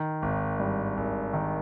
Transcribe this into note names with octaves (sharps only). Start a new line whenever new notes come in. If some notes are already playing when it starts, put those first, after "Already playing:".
Already playing: D#3
G#1
G2
G#1
D#3